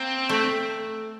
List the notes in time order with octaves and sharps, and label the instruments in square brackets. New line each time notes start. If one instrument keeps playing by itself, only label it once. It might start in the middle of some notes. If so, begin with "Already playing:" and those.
Already playing: [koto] A#3 [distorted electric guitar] C4
[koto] A3